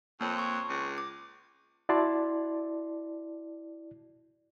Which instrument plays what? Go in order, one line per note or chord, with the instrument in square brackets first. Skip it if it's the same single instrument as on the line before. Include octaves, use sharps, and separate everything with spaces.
[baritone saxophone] F2 [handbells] A#3 C#5
[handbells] C6 C#6
[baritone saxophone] C#2
[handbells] D6
[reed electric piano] E4 F#4 D5 A5 C6